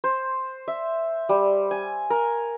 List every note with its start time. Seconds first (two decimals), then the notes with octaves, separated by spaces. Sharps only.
0.04 C5
0.68 E5
1.29 G3
1.71 G#5
2.10 A#4